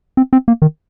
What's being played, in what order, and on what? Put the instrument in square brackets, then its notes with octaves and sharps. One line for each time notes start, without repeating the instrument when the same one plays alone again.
[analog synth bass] C4
C4
A#3
D#3